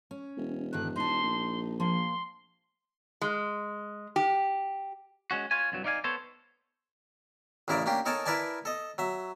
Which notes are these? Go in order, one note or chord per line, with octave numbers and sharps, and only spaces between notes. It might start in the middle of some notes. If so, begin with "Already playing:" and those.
C#4
E1
G2 D3 D#3 F#6
D#4 A5 C6
A#1
F3 A#3 C6
G#3
G4
G#3 C#4 F#4
F4 C#5 G#5
C2 G2 F#3
D#4 D5 F5 G#5
B3 A4 C5 C#5
A1 C#3 E4 A#4 D5
A#3 C#4 D4 G4
D#4 A4 A#4 C#5 G#5 A5
E4 A#4 B4 D5 G#5 A5
A4 D#5
F#3 E5